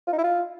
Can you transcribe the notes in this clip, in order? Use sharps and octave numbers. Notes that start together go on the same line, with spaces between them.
F4
D#4
E4
F4